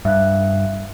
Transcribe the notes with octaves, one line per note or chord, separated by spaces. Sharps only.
G2 E5 F5 F#6